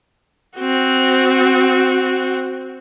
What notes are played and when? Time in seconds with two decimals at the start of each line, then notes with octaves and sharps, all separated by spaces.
0.57 C4 F#4